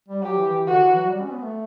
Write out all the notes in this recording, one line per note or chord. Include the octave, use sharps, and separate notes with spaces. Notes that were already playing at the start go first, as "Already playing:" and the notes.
G3
F#3 G4
E3
E3
D3 F#4
E3
F#3
G3
C#4
B3
A3